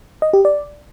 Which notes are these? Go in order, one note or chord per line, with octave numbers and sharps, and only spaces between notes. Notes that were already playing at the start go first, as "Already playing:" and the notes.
D#5
G4
D5